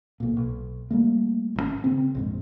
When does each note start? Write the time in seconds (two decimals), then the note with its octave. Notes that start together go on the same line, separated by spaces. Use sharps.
0.20 B1 A#2
0.37 B1
0.90 G3 A3 A#3
1.56 G#1 D3 C#4
1.84 C#3 C4
2.15 A#1 F2 G#2